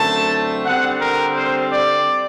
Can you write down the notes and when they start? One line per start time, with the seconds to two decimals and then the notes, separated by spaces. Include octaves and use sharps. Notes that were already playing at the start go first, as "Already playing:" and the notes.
Already playing: F#2 D3 A3 C4 A5
0.66 D3 G3 C4 F#5
1.01 A#4
1.35 C5
1.71 D5